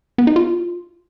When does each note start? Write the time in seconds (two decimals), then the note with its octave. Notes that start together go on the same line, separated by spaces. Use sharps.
0.18 B3
0.27 D#4
0.36 F4